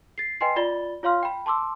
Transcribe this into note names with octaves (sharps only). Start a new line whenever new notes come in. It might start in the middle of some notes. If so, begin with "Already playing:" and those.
A6 C7
B4 D#5 G5 G#5 C6 C7
F4 D5 B5 A6 G7
F4 C#5 F5 C6 F6
G5 B5
A5 C6 D6 E6